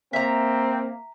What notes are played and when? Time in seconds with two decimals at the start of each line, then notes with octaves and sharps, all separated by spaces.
0.13 A#3 C4 E5 A#5